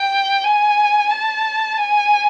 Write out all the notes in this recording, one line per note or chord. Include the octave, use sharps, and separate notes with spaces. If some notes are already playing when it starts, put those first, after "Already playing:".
Already playing: G5
G#5
A5
G#5